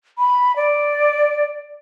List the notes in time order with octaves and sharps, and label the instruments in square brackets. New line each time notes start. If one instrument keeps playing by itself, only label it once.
[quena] B5
D5